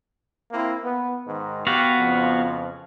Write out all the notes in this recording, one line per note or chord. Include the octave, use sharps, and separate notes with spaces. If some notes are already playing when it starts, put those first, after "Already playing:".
A#3 C4 E4
B3
G#2 D#3
B3 F#4 G4 F5
F2 C#3 F3